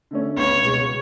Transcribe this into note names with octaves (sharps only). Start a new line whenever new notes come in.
D3 A3 C#4
C#2 C#5
B2 G#3